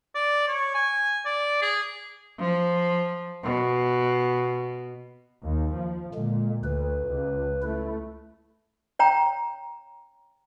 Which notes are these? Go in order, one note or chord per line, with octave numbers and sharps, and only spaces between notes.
D5
C#5
G#5
D5
G#4
F3
B2
D#2
F3
A#2 D3 G#3
D2 B4
C#2
A3 E4
C#5 G5 A#5